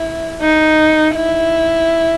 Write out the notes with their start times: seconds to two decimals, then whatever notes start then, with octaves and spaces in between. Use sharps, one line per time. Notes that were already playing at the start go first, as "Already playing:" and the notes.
Already playing: E4
0.42 D#4
1.15 E4